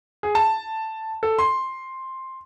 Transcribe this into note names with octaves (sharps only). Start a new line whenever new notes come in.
G#4
A5
A4
C6